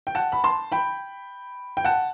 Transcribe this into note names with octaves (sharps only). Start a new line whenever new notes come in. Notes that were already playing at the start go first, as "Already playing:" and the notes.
G5
F#5 A5
B5
A5 C6
G5 B5
G5
F#5 A5